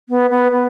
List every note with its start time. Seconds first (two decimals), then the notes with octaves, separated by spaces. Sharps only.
0.09 B3
0.31 B3
0.52 B3